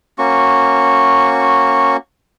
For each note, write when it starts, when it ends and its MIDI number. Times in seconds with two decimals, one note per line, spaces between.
0.18 1.97 58
0.18 1.97 61
0.18 1.97 66
0.18 1.97 85